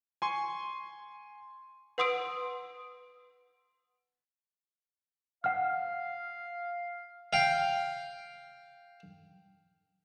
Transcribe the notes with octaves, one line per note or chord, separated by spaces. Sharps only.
G#5 C6 C#6
B4 F#5 C6 D#6 E6 D7
F5 F#5 F6
F5 G5